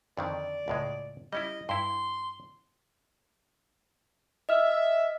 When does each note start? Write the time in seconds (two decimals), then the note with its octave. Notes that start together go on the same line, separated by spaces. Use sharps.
0.17 F2 D3 D#3 D5
0.68 C#2 A2 G#3
1.33 G3 C#4 E4 D#5
1.69 G2 E4 C6
4.49 D#5 E5 F6